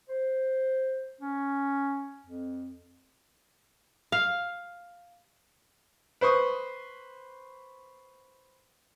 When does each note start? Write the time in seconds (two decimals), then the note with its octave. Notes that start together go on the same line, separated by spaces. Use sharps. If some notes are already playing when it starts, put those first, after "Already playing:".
0.09 C5
1.21 C#4
2.26 F2
4.12 F5
6.21 B4 C5 C#6 D#6